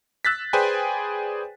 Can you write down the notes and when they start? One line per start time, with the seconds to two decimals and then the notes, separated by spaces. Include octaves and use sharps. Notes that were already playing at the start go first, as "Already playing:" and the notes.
0.25 E6 F#6 A6 B6
0.53 G#4 B4 C5 D5 G5 G#5